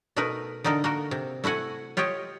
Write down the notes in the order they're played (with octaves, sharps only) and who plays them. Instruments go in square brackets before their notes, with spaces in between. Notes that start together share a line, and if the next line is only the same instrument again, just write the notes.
[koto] B2 A3 D#4 A#4 B4
D3 A#3 D#4 A4 A#4
A#3 F#4 A#4
C3
A3 E4 F#4 F#5 G#5
F4 G4 C#5 D#5 G5